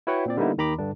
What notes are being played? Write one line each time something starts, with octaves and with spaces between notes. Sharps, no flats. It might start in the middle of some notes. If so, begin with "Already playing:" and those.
E4 F#4 B4 C#5 F#5 G5
A#2 C4 D5
D3 G3 A#3 B3 D#4 E4
D#2 D#3 A#5 B5 D6
G2 D3 D4